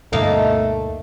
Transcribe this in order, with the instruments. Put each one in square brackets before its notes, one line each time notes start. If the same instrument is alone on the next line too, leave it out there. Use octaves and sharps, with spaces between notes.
[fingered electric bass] D2 G2 B2 [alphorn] A3 [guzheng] A#3 D#4 F5